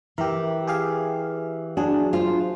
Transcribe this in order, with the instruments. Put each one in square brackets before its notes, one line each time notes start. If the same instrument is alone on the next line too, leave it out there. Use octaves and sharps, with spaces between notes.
[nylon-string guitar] E3 [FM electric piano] G4 A#4
[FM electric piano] G4 G#4 F5
[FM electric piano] F#3 G#4 [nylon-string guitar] D4
[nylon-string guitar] F4 C5